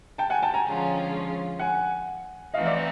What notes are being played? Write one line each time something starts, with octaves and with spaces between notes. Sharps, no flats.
G5 A5
F#5 G#5
G5 A5
G#5 A#5
D3 F3 G#3 C#4 F4
F#5 G#5
E3 A3 C4 D#4 F#4 D#5 F5
D5 E5